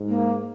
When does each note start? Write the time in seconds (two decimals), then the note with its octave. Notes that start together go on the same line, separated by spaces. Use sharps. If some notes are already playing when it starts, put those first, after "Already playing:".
Already playing: G#2
0.08 A#3